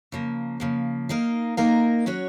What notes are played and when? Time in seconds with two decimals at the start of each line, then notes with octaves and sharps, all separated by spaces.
0.12 C#3 F3 A#3
0.60 C#3 F3 A#3
1.09 A#3 D#4 A#4 F5
1.57 A#3 D#4 A#4 F5
2.06 F#3 C#4 F#4 C#5